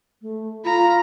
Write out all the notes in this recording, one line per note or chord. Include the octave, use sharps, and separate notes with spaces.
A3
F4 A#5 B5